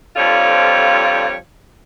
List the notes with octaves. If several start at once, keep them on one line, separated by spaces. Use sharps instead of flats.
F2 D3 F3 G3 F4 C#5